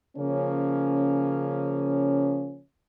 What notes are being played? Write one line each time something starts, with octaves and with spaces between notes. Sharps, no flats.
C#3 F3 A#3 C#4